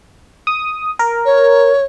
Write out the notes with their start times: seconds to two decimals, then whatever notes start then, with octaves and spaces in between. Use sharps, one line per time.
0.47 D#6
0.99 A#4
1.25 C#5